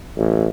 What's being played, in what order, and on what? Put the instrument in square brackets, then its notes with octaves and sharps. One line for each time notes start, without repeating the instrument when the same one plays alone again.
[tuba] A1